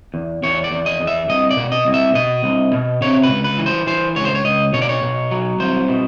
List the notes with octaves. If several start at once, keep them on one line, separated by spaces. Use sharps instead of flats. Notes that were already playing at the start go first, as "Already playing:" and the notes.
E2
E2 C#5
D5
E2
D#5
E2
E5
C2 D#5
D5
B2
D#5
C2
E5
B2 D#5
C2
B2
C3 C#5
B4
C#2
B4
E3
C5
E3 C5
C#2 C#5
C5
C#5
C#2 D#5
B2 C#5
D5
C#5
B2
F#3
C2 C5
B2